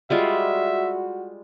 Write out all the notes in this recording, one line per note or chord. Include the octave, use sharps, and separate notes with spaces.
G3 G#3 F4 F#4 E5